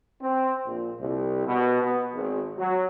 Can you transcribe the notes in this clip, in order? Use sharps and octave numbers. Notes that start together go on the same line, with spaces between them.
C4
A#1
C2
B2
B3
G#1
F#3